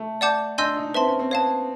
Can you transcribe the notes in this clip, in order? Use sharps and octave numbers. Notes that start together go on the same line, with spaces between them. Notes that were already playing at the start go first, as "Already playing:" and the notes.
Already playing: A3
D5 F#5 A5 D6 G6
D4 D#5 G#5 C6 E6 G6
D#4
C4 B4 E5 A5 C6
C#4
C4
B3 C#5 F5 A5